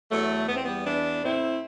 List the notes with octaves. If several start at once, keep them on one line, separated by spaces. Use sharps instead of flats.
E2 F#3 A3
E2 B3
C4
G3 B3
E3 B3 D4
A2 C4 E4